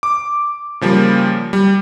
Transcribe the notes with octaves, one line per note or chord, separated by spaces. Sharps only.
D6
C#3 F3 G3 A#3
G3